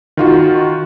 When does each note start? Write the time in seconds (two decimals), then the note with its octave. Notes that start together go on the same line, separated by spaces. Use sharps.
0.17 D#3 F4 F#4